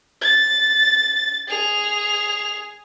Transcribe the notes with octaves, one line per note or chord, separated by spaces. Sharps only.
A6
G#4 F7